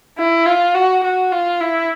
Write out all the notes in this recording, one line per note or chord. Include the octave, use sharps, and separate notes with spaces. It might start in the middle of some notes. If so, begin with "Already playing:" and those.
E4
F4
F#4
F#4
F4
E4